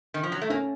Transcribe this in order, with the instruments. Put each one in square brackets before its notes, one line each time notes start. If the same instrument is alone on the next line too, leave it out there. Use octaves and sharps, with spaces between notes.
[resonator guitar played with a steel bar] D#3
F3
F#3
A3
[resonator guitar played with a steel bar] A#3 [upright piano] C#4